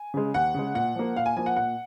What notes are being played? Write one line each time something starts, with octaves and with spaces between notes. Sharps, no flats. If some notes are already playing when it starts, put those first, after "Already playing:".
Already playing: G#5
C#3 G#3
D#2 F#5
C#3 G#3
A#2 F#5
F3 A#3
A#2 F5
G#5
F3 A#3 G#5
F#5
A#2 F#5